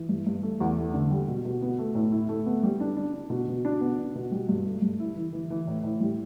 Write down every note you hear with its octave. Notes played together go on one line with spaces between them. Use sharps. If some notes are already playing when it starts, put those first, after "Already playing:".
Already playing: E3
G2
G2
A3
E2
A3
D3
G3
B2
B2
B3
A3
A2
E4
A3
B3
G3
D4
D4
D4
B2
B2
D4
B3
D4
B2
G3
G2
A3
G2
E4
E3
E3
E3
A2
A2
G3